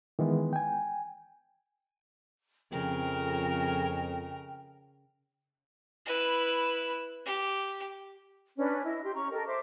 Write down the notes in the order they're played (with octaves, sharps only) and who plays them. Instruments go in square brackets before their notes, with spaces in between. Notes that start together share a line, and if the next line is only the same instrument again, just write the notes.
[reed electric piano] D#3 E3 G#3 B3
G5 G#5
[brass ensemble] F2 [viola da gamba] C#3 A#4 [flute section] G5
[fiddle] E4 B4
G4
[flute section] C#4 D4 B4
E4 D#5
G4 C6
C#4 A#5 C#6
G4 A4 A#4 D#5
C5 E5 D6